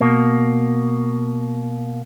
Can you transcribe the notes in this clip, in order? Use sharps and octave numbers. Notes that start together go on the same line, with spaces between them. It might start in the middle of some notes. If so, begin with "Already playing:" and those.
B2 A#3